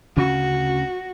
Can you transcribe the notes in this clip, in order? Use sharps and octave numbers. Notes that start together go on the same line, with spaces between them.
D2 C#3 C#4 F#4